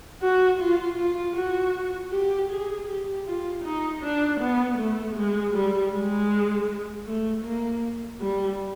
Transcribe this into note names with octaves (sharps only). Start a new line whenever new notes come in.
F#4
F4
F4
F#4
G4
G#4
G4
F4
D#4
D4
B3
A3
G#3
G3
G#3
A3
A#3
G3